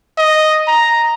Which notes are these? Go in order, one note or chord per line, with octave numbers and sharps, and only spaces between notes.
D#5
A#5